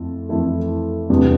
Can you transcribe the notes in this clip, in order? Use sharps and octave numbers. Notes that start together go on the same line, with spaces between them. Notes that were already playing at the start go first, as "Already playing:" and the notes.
Already playing: F2 A3 E4 A4
F2 E3 A3 E4 A4
E2 C3 G3 B3 D4